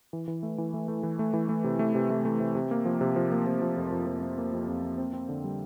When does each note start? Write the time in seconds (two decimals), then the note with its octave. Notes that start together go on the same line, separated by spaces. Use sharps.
0.13 E3
0.28 E3
0.43 A3
0.58 E3
0.74 A3
0.88 A3
1.03 E3
1.19 A3
1.33 E3
1.49 A3
1.64 C3
1.79 A3
1.95 C3
2.10 A3
2.25 A3
2.40 C3
2.55 C3
2.71 A#3
2.85 F3
3.01 C3
3.16 F3
3.32 A#3
3.46 C3
3.62 F3
3.77 F2
3.92 F2
4.07 F3
4.22 A#3
4.38 A#3
4.53 F2
4.68 F2
4.83 A#3
4.98 C4
5.13 C4
5.29 D3
5.44 G3